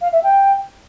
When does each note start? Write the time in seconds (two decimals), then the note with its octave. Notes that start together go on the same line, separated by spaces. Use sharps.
0.01 F5
0.12 E5
0.23 G5